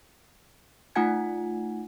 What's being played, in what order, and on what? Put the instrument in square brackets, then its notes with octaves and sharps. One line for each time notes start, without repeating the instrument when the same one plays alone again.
[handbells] A3 D#4 F4 F#5 G#5 G#6